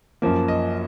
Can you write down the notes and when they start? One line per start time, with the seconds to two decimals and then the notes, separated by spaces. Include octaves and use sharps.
0.22 F#2 F3 A#3
0.48 D#5